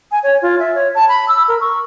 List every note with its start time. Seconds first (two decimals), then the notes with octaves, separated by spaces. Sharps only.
0.12 G#5
0.23 C#5
0.42 F4
0.59 E5
0.75 C#5
0.95 A5
1.09 B5
1.28 E6
1.48 A#4
1.61 C#6